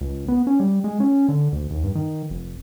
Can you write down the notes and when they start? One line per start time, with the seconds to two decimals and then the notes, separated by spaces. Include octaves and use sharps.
0.01 C#2
0.28 B3
0.47 C#4
0.60 G3
0.84 G#3
1.00 C#4
1.28 D3
1.53 D2
1.70 D#2
1.83 G2
1.95 D#3
2.30 F1